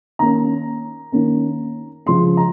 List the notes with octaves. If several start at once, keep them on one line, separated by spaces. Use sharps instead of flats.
D#3 A#3 C#4 A#5
D#3 A#3 C#4
C#3 F3 G#3 C6
A#5